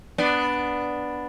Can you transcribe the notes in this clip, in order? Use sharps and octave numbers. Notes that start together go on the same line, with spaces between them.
B3 D4